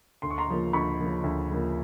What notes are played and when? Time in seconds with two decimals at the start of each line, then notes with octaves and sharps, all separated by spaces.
0.22 D2 C6
0.30 C#6
0.38 A#5 C6
0.48 C#3 F3 A#3
0.73 D2 B5 C#6
0.98 C#3 F3 A#3
1.24 D2
1.50 C#3 F3 A#3